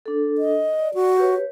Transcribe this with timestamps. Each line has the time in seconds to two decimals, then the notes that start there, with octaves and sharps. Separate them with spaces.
0.06 D4 A4
0.38 D#5
0.79 D5
0.94 F#4
1.18 G4 B4 C#5